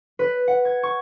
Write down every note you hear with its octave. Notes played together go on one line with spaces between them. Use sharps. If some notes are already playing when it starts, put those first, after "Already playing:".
B4
F#5
G#6
C#6